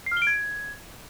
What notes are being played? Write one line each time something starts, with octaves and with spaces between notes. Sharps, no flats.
C7
F6
G7
D7
G#6